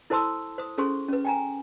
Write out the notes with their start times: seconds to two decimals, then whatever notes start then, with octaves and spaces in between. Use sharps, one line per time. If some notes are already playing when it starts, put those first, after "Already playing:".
0.10 E4 A4 C5 A5 C6 E6
0.58 C5 D#6
0.78 C#4 G#4 A4 C5 C6 C#6
1.09 C#4 B4
1.25 G5 G#5 A#5